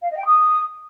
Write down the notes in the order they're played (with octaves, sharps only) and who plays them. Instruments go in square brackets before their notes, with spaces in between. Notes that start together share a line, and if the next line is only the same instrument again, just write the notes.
[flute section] F5
D#5
G5
D#6